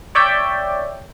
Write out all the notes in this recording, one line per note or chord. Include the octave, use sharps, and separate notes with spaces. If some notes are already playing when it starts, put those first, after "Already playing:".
C#5 D5 E5 G5